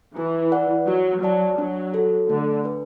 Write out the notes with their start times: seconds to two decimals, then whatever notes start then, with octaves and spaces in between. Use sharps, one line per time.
0.16 E3 E4
0.52 B4 D5 F#5
0.88 F#3 F#4
1.22 F#3 D5 A5
1.58 F#3 D4
1.94 F#4 A4
2.29 D3 A3
2.64 D4 B4